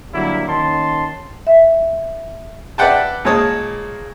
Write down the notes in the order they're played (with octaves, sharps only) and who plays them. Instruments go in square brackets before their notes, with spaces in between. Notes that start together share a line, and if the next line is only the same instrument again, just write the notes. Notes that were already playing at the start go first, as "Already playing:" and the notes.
[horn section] D3 F#3 G3 A#3 E4
D#3 A#3 C#4 A5 C6
[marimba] E5
[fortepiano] B4 D5 E5 F#5 G5 A5
A#2 G#3 A#3 C#5 A5 D#6